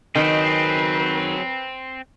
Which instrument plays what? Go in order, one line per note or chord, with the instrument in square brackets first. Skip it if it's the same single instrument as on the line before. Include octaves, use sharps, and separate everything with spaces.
[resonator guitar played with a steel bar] D#3 [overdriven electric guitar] F#3 G#4 [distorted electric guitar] C4 [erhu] B4